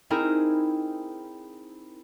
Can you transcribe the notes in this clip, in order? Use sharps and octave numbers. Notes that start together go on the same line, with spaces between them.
C4 D#4 E4 G#4 A#4